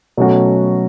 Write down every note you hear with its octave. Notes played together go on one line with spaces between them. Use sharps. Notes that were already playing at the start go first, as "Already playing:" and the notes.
B2 F#3 A3 C#4 F#4